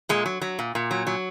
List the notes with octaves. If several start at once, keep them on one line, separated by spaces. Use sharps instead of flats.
A#2 G#3
F#3
F#3
A#2
A#2
F#3
F#3